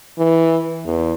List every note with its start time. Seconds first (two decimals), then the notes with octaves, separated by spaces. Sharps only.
0.18 E3
0.85 E2